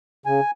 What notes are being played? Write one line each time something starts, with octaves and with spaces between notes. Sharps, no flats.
C#3 G#5